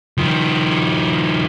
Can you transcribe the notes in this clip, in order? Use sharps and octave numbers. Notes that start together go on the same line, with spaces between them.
D#3 F3